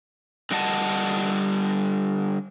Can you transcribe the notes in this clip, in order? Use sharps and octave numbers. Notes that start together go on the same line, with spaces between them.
D3 G3 D4 D#5 F#5 A5